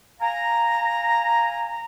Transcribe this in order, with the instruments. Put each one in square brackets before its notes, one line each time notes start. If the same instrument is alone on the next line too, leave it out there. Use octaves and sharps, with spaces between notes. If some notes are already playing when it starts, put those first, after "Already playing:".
[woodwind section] F5 G#5 A#5